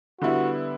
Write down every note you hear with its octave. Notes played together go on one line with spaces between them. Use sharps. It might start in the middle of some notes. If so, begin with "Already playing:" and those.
D3 G3 B3 E4 F#4